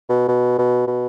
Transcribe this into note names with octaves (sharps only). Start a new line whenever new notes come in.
B2
B2
B2
B2